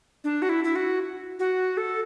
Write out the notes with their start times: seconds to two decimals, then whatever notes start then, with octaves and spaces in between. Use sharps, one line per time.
0.24 D4
0.42 F#4
0.49 E4
0.64 E4
0.76 F#4
1.39 F#4
1.77 A4